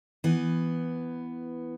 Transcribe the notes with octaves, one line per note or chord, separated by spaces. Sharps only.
E3 B3